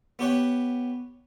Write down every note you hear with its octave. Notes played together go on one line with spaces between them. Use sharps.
B3 G4 C#5 F#5